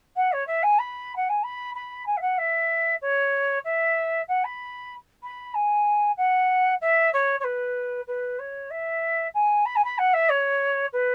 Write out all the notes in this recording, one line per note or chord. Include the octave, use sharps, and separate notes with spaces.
F#5
C#5
E5
G#5
B5
F#5
G#5
B5
B5
G#5
E5
F#5
E5
C#5
E5
F#5
B5
B5
G#5
F#5
E5
C#5
C#5
B4
B4
C#5
E5
G#5
B5
G#5
B5
F#5
E5
C#5
B4